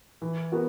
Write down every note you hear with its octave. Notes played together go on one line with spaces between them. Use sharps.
E3
B3 F#4 A#4